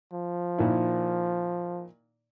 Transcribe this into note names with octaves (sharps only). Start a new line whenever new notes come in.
F3
A#2 D#3 E4